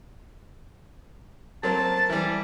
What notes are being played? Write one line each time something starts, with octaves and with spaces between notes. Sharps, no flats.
F#3 A#3 C4 A5
E3 G3